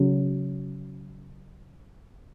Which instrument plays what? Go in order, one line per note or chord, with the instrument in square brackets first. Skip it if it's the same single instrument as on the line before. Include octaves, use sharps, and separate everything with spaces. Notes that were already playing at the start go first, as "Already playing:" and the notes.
Already playing: [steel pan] C#3 F#3